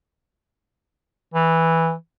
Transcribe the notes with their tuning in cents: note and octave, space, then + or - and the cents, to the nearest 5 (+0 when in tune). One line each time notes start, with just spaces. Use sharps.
E3 -5